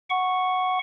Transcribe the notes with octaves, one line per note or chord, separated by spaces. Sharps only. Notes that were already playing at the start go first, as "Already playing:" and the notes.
F#5 C#6